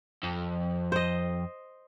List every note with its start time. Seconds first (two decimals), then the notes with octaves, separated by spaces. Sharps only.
0.23 F2
0.92 C5 D#5